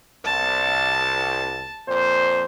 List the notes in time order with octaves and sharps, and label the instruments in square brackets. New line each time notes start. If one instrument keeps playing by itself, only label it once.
[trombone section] C2 [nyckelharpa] A5
[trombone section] F2 A#2 C5